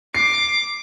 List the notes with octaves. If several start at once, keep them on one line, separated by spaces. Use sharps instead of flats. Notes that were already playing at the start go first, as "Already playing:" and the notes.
D6 C7